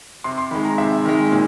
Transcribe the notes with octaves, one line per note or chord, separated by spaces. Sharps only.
C3 C6
C6
D#3 G#3 B5
A#5
C3 E5
D#3 G#3
A#2